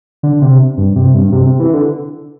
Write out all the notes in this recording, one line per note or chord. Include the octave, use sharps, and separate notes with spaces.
D3
C3
G2
C3
G2
C3
C3
E3
D3